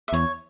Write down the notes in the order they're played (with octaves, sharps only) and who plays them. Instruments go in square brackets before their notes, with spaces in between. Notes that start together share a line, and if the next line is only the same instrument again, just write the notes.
[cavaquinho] E5
[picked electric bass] E2 [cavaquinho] C#5